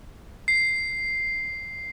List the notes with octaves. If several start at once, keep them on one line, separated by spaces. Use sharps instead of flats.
C7